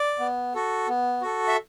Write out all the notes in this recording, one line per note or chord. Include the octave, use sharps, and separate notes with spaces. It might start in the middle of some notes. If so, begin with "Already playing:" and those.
Already playing: D5
B3
F#4 A4
B3
F#4 A4
E5